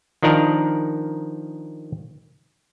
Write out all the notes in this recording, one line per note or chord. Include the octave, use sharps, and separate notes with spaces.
D#3 F3 D4 D#4 A#4